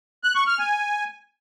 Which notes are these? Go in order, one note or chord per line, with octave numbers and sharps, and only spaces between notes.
F#6
C#6
F6
G#5